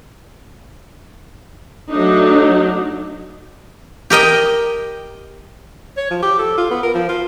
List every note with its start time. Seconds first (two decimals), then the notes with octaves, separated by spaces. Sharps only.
1.91 F#3 A3 D4 D#4
4.10 G4 A#4 D#5 G5
5.97 C#5
6.11 F3
6.22 G4
6.39 A4
6.58 F4
6.70 B3
6.83 A#4
6.94 F3
7.09 F4